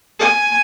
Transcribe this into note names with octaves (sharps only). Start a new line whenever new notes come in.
G#5